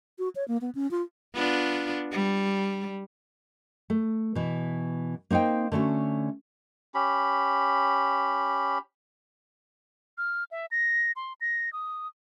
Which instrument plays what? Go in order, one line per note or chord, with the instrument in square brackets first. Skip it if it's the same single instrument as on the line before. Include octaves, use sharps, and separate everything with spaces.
[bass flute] F#4
C#5
A#3
B3
C#4
F4
[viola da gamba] B3 D4 F4
G3
[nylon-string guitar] A3
B2 E3
A#3 C4 D#4 C5 G5
D3 A3 C#4 F#4
[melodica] C#4 G4 B5
[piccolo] F6
E5
A#6
C6
A#6
D#6